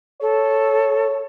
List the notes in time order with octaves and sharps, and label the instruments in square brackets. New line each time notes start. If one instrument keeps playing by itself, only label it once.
[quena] A4 [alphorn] C#5